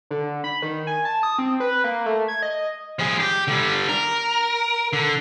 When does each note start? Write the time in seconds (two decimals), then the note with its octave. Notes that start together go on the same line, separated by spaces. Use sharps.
0.11 D3
0.44 B5
0.62 D#3
0.87 G#5
1.05 A5
1.23 D#6
1.39 C4
1.60 B4
1.84 A#3
2.06 A3
2.28 G#6
2.42 D#5
2.99 F3 G#4
3.20 G4
3.48 D3 G3
3.89 A#4
4.93 D3